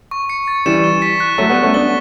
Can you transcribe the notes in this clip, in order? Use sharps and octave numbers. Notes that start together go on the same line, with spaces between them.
C#6
C#7
A6
E3 G3 E7
G7
B6
F#6
F#3 A3 B6
G3 B3
F#6
A3 C#4
B3 D4 G7